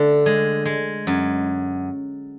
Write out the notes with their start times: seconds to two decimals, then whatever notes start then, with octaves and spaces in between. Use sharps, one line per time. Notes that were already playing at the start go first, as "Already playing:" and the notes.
Already playing: D3 A3
0.26 G#3
0.65 G#3
1.07 F#2